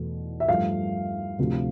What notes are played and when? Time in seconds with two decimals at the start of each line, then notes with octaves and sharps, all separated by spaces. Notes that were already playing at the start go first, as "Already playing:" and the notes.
Already playing: E2 B2 A3
0.40 E5
0.48 G2 F3 A3 F5
1.39 D2 C3 F3